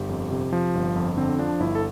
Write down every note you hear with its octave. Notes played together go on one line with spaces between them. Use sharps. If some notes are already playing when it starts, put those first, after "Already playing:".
Already playing: G1 G4
F2
C3
F3
G1
F2
D3 C4
F3 D4
G1 E4
A4